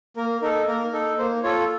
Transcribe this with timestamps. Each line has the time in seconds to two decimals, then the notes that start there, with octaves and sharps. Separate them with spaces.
0.17 A#3 A#4
0.42 D#4 A4 A#4
0.67 A#3 A#4
0.93 D#4 A4
1.19 A#3 C5
1.43 F4 A4 C#5